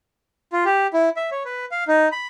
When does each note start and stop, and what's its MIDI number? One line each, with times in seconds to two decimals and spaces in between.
0.52 0.64 65
0.65 0.87 67
0.93 1.09 64
1.16 1.30 76
1.31 1.43 73
1.45 1.65 71
1.71 1.84 77
1.88 2.09 63
2.12 2.28 83